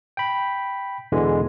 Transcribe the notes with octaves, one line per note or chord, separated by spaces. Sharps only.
G5 B5
E2 B2 D3 E3 G#3